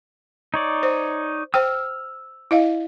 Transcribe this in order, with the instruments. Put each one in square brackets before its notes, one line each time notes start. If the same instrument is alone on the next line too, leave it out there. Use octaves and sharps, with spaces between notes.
[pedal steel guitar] D#4 C#5 D5
[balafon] C5
[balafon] C5 G5 [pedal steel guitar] E6 F6
[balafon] E4 D#5 F5